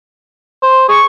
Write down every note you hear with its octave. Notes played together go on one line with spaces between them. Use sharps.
C5
G#4 C#6